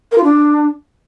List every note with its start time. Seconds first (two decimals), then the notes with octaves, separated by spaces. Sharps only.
0.12 A#4
0.18 F4
0.24 D4